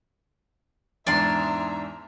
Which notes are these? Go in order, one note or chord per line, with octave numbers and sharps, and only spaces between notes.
E2 G#2 D4 E5 A#5 C6